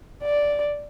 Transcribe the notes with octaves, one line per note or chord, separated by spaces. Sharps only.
D5